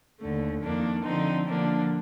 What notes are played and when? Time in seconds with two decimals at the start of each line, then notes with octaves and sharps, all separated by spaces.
0.19 D#2 D3 A3
0.62 F2 D#3 A#3 D4
1.04 D3 F3 C4 D#4
1.46 D3 F3 A#3 D4